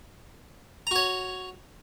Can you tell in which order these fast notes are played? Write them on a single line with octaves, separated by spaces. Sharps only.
A#5 F#4 C#5